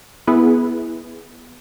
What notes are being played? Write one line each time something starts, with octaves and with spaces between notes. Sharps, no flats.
B3 E4 G#4 B4